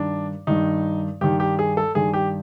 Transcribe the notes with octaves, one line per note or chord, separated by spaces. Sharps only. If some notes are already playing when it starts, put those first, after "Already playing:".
Already playing: G2 D#3 D4
G2 D#3 D#4
G2 D#3 G4
G4
G#4
A4
G2 D#3 G#4
G4